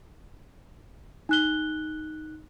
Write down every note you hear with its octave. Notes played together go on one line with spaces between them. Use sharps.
D#4 F#6 G7